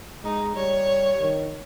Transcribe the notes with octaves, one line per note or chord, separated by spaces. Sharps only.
G#3 D#4
G3 C#5
D#3